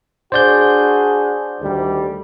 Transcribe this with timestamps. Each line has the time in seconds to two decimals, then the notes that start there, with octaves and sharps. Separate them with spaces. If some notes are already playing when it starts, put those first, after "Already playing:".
0.32 D4 F#4 G#4 C5 D5 G6
1.60 D2 D#3 G3